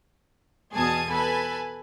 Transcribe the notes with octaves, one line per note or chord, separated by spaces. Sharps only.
E2 B2 G#4 A5 D#6 G#6
A4 B4 G#5 B5